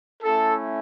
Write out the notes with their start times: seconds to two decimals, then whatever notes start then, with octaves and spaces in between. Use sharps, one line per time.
0.23 A3 C#4 E4 A4